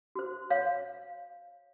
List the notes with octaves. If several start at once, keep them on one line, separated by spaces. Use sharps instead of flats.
F#4 C5
C#5 F5